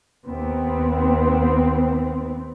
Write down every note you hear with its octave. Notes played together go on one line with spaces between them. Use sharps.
D#2 B3 C4